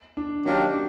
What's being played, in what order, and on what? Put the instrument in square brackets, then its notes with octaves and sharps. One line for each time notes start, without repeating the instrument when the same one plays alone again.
[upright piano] D4
[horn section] D#3 F#3 A#3 D4 G4 [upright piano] C#4
[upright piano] D4